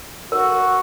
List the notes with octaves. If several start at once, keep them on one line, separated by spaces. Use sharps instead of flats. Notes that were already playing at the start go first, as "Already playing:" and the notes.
F#4 A#4